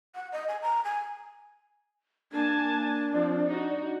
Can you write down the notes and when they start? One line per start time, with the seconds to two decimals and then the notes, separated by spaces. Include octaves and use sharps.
0.15 F#5
0.32 D#5
0.48 G#5
0.62 A#5
0.85 G#5
2.33 A#3 D4 G#5 A5
3.14 F3 C4 D5
3.47 D#4 F#4